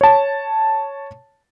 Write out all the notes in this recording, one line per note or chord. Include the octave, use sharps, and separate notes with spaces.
C#5 A5